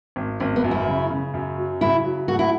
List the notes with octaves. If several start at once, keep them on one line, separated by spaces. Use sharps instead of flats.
G#1
G#1 C#4
B3
F#2
E4
C#3
C#3
F#2
F#3
C#3 E4
F#3
A3 F#4
E4